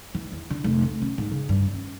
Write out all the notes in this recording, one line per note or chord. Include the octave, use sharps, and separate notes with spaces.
E3
E2
D3
F1
D2
C#4
G#2
C#3
G2
C#4